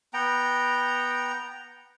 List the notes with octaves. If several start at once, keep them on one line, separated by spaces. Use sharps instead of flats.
B3 G5 A#5